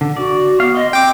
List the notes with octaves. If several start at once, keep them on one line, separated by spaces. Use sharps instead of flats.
D3
F#4 D5
B3 F5
D#5 C6
C4 G5 D6